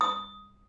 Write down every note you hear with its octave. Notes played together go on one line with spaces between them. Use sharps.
D#6